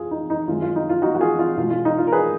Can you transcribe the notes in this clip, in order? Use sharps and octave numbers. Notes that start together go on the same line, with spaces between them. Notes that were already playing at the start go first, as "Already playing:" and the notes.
Already playing: F2 F4 G#4
D#4
D#4
F#2 D#3 G#3 F4
F4
D#4
F4
D#4 F#4
F#4
F4 G#4
F4
B2 F4
G#3
F4
D#4
F4
A#4
G#4 B4